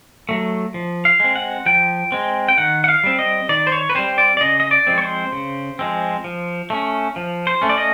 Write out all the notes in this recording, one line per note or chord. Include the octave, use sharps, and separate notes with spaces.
F#3 A3
F3
F5
G#3 C4
F#5
F3 G5
G#3 C4
G5
D#3 F#5
F#5
F5
G3 C4
D#5
D#3 D5
C5
C#5
B4
G3 C4 C5
D5
D5
C#3 D#5
D#5
D5
F3 G#3 C4
C#5
C5
C#3
F3 G#3 C4
F3
A3 C#4
F3
C5
A3 C#4
D5
D#5